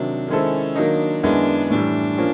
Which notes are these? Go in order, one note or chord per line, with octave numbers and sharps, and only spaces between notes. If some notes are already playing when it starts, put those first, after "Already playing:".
Already playing: C3 D#3 F#3 D4
D#3 G#3 C4 C#4 E4 A4
D#3 F#3 A#3 D4 D#4
F#2 D#3 G#3 B3 D4 E4
A2 E3 G3 D4
F3 A#3 C#4